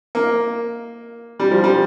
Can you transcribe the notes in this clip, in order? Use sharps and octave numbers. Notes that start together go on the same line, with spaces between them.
A#3
G3
F3
G3